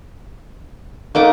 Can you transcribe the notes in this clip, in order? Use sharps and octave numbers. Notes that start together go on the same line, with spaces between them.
A3 A#3 D#4 F#5 D6 D#6